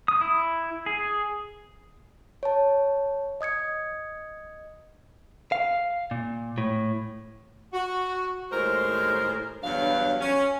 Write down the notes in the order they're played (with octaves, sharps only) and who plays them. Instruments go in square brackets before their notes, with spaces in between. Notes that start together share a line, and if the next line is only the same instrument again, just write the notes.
[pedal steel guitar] D#6
E4
G#4
[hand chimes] C#5 A5
D#5 D#6 G#6 C#7
[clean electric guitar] F5
A#2
A2
[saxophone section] F#4
D#2 A2 G#3 A#4 C5
E2 G2 C#3 F#3 D4 F5
C#4